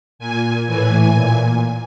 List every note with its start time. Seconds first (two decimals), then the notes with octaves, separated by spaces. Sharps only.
0.19 A#2 G#5
0.67 A2 E3 G#5
1.14 A#2